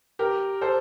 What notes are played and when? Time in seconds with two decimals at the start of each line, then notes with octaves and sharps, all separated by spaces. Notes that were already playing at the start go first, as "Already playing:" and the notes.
0.19 G4 A#4
0.61 A4 C5